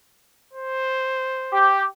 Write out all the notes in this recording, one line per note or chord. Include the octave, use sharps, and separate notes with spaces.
C5
G4